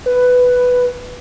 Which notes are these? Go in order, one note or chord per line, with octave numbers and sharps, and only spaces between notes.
B4